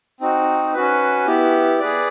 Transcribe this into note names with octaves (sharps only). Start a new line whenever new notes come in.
C4 D#4 F#4
C#4 F#4 B4
B3 E4 G4
G#4 B4 D5